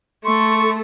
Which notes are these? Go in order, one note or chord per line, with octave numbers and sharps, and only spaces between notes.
A3 A4 C6 C#6